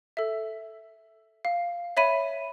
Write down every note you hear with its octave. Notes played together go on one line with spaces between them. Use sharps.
A4 E5
F5
C#5 E5 B5 D#7